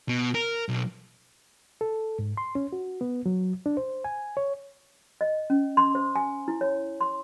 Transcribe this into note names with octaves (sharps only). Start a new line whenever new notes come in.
B2
A#4
B1
A4
G#2
C6
C#4
F#4
B3
F#3
D4
C5
G#5
C#5
D#5
C#4
C6
C5
G#5
E4
C#5
C6